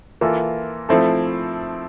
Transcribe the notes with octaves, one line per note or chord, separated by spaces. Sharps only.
E3 A#3 F4 A4
F3 A3 C4 E4 A4